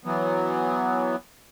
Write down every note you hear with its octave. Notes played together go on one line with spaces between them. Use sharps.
E3 F#3 B3